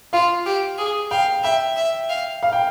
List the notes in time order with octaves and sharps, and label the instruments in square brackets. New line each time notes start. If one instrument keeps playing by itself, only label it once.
[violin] F4 [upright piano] F5
[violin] G4
G#4
[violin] F5 [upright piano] G5
[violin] E5 [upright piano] G5
[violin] E5
F5
[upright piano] F5
G5